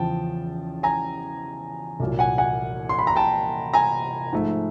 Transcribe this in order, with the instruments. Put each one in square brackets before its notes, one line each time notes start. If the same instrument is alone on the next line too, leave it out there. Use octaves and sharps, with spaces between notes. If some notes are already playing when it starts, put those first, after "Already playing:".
Already playing: [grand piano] E2 C#3 F3 G5 A5
G#5 A#5
C2 A#2 F#3
F#5 G#5
F#5 G#5
C6
B5
A#5
G5 A5
G#5 A#5
G#2 F3 A3